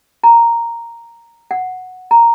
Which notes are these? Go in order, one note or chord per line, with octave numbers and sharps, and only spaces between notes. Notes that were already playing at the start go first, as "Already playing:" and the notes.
A#5
F#5
A#5